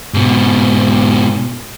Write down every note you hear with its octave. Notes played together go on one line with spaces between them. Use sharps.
G#2 B2